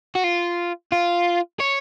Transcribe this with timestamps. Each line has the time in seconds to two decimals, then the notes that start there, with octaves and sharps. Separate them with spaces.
0.15 F#4
0.24 F4
0.92 F4
1.60 C#5